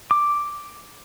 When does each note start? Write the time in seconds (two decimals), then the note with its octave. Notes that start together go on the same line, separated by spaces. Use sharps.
0.11 D6